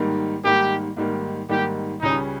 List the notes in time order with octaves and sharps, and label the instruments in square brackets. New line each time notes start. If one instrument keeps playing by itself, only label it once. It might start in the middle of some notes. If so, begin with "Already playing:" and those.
Already playing: [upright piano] G#2 D#3 G3 A#3
[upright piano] G#2 D#3 G3 A#3 [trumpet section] G4
[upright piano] G#2 D#3 G3 A#3
[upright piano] G#2 D#3 G3 A#3 [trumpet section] G4
[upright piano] C#2 C#3 G3 C#4 [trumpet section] D#4